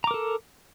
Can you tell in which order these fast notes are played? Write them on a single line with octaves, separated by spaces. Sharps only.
A#5 D6 A#4 A4